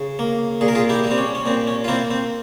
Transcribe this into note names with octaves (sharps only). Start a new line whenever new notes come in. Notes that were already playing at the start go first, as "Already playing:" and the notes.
Already playing: C#3
A#3
A#2 G#4
A#4
F4 G#4
E4 G4
G3
C4
C#4
C#4
A#2 C4
C#4
F4
A#3 C4 E4
C4